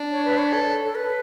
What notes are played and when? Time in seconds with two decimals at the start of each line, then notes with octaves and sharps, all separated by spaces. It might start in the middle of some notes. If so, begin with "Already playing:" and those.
Already playing: D4
0.11 C#5
0.25 B4
0.38 C#5
0.53 A4
0.85 A4
0.95 B4